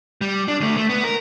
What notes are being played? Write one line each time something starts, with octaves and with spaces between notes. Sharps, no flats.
G3
D4
D3 A3
A3
B3
A#4